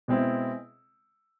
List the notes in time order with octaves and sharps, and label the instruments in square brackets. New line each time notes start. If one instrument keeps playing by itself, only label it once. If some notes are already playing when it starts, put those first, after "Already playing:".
[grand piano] B2 G#3 C4 E4